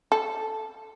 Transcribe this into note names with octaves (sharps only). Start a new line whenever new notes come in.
A4